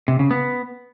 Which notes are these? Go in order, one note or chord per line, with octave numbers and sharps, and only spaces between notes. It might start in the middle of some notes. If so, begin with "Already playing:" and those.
C3
C#3
B3